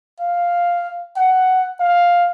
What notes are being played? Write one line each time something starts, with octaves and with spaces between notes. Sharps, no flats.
F5
F#5
F5